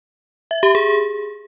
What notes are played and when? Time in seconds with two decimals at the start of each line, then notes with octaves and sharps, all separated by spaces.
0.51 E5
0.63 G4
0.75 G#4